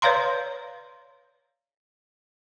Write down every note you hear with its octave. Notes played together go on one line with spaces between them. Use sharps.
B4 C#5 D5 F5 A#5 C6